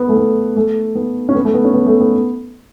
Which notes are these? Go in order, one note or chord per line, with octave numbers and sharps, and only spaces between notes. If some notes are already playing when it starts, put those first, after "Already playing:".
Already playing: B3
A3
B3
A3
B3
C#4
B3
A3
B3
C#4
B3
A3
B3